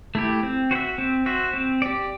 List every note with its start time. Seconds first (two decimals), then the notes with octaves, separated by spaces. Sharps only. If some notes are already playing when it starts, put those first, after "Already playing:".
0.15 A3 E4 G4
0.43 C4
0.71 F#4 C5
0.75 E5
0.98 C4
1.26 F#4 C5 E5
1.53 C4
1.82 G4 D5